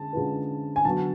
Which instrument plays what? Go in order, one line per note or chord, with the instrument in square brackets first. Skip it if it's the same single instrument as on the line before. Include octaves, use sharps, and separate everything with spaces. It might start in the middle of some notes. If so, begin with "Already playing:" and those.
Already playing: [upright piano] D3 G#3 C#4 [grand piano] A5
[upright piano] D3 G#3 C#4 F4 B4
[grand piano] G#5
[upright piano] D3 F#3 B3 F#4 [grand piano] A5